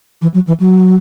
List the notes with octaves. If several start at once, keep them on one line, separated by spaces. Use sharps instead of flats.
E3
F#3
E3
F#3